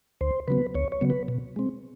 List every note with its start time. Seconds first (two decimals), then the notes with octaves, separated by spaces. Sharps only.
0.21 D2 C5
0.48 C#3 F#3 B3 B4
0.75 D2 C#5
0.92 C#5
1.01 C#3 F#3 B3
1.10 B4
1.28 B2
1.56 G#3 C4